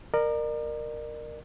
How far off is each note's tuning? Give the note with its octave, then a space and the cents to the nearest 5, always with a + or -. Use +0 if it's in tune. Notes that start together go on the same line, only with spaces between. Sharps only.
A#4 +0 D5 +40